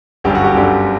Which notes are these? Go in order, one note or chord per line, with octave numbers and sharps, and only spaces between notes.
G1 F#2 D3 G3 G4
F#4
G4
G1 F#2 D3 G3